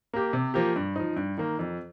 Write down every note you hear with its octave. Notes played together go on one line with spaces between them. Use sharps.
A#3 G4
C3
F3 A#3 G4
G2
F3 D#4
G2
D#3 A#3
F2